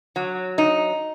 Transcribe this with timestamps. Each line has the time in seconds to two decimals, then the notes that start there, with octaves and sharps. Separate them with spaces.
0.16 F#3
0.58 D#4